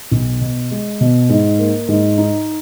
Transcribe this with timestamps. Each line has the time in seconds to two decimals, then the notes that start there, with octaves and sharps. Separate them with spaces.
0.11 B1
0.41 B2
0.71 G#3
1.01 B2
1.29 G#2
1.59 A#3
1.88 G#2
2.18 D#4